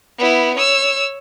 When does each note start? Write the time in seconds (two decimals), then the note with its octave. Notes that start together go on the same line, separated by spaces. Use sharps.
0.18 B3 E4
0.57 C#5 E6